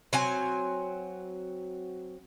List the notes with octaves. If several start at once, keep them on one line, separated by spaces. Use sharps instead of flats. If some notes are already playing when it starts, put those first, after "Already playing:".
F#3 C4 G#5